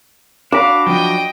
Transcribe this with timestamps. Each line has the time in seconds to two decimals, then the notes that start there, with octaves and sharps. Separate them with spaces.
0.52 D4 F#4 F5 B5 D6
0.86 F3 F#3 D#5 G5